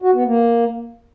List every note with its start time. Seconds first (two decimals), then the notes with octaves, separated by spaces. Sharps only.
0.02 F#4
0.14 B3
0.26 A#3